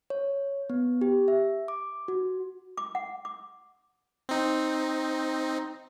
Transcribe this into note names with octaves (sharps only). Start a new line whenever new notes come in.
C#5
B3
G4
E5
D6
F#4
D6
F#5
D6
C4 D#4